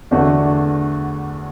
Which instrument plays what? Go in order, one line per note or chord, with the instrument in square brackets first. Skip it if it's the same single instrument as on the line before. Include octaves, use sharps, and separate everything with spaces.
[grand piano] E2 D3 A3 D4 F#4